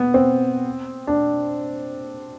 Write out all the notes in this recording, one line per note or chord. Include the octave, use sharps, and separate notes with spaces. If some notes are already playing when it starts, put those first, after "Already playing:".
Already playing: B3
C4
D4